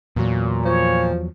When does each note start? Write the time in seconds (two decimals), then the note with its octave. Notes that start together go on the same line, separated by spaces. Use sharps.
0.16 E2 A#2 F#3
0.65 F3 C#5